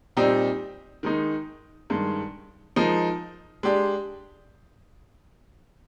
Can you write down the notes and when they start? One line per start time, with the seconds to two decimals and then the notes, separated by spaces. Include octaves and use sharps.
0.17 A#2 G3 C4 D#4 G4
1.03 D#3 G#3 D#4
1.90 G2 D#3 G#3
2.76 F3 G#3 D#4 A#4
3.63 G#3 D4 G4